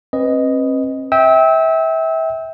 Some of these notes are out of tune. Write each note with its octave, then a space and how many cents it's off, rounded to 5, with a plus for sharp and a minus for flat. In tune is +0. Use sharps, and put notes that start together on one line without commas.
C4 +40 B4 +0 D#5 +0
E5 -25 G5 +0 E6 -30